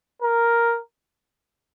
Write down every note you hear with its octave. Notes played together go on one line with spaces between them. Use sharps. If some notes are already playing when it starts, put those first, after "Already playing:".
A#4